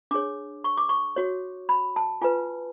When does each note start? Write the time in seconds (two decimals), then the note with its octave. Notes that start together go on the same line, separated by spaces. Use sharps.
0.11 D4 G#4 C#5 D6
0.64 C#6
0.77 D6
0.89 C#6
1.16 F#4 C#5
1.69 B5
1.96 A5
2.21 F4 B4 G#5